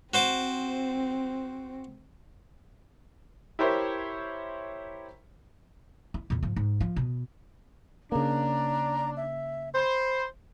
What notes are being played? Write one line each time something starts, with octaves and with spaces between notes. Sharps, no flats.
C4 F#4 C5 D6
E4 G4 A#4 C5 C#5 E5
E4
E2 A#2
G#2 F3
G#2
F3
B2
C#3 A#3 D4 A#5
E5
C5 B5